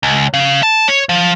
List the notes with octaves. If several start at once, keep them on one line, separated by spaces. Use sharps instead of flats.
C#2
C#3
A5
C#5
F3